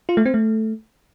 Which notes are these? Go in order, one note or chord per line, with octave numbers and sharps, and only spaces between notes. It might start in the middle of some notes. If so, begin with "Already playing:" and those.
F4
A3
C4
A3